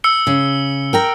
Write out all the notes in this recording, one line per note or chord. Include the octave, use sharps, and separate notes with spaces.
E6 C#7 G7
C#3
A#4 G5 A#5